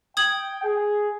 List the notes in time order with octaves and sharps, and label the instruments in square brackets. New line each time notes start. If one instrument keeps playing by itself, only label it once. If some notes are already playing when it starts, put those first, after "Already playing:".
[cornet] G5 [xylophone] D#6 G#6 F#7
[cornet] G#4